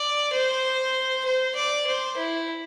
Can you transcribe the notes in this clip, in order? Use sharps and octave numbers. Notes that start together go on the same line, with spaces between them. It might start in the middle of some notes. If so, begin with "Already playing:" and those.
Already playing: D5
C5
C5
D5
C5
E4